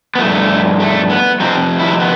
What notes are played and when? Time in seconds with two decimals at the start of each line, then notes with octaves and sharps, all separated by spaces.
0.15 B3
0.19 G2 F3 A3
0.80 A3
1.10 B3
1.40 F2 C3 F3 C4
1.79 E4
2.00 B3